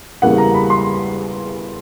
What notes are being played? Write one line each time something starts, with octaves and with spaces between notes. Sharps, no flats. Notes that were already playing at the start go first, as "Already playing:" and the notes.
E2 C#3 E3 G3 A#3 F#5
A#5
B5
C6